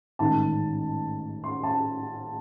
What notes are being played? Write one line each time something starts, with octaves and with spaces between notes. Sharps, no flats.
A1 G#2 D#3 A5
C6
A5